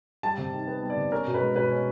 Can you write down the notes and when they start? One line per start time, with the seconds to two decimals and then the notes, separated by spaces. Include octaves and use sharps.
0.23 G3 A5
0.38 C3
0.53 D#3
0.67 B3
0.82 G3
0.90 D5
0.97 C3
1.12 C#4 A#4
1.27 B2
1.34 B4
1.42 G#3
1.56 B2 B4
1.71 C#4